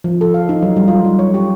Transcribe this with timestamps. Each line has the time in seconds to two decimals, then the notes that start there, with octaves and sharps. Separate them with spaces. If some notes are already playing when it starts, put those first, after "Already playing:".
0.04 F3
0.21 A4
0.34 F5
0.49 D#4
0.63 F#3
0.77 G3
0.88 F4
1.05 G3
1.19 C#5
1.34 G4